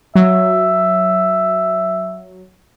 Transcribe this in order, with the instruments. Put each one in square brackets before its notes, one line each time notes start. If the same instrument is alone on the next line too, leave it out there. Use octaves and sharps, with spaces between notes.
[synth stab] F#3 [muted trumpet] E5